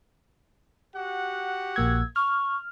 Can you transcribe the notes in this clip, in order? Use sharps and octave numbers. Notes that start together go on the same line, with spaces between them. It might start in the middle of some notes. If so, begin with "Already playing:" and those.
F#4 G4 F#5
A#1 A#3 E6 G#6
C#6 F6